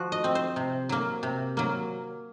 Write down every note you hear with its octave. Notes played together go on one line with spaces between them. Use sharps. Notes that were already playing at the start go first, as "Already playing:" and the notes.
Already playing: F3 F#4
D#5
C4
C5
C3
F#3 A#3
C3
F#3 A#3